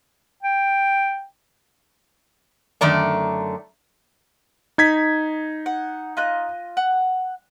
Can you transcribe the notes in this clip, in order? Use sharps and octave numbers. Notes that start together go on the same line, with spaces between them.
G5
F#2 D3 D#3 A3 D5 A#5
D#4 G#6 B6
F#5
F4 D#5 F#6
F#5